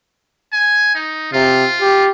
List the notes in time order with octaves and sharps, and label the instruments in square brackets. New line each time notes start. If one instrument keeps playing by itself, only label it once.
[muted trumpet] G#5
D#4
[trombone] C3 [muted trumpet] F4
[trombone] G4